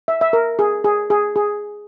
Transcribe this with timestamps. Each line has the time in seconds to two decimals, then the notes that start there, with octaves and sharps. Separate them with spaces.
0.08 E5
0.21 E5
0.33 A#4
0.59 G#4
0.84 G#4
1.10 G#4
1.36 G#4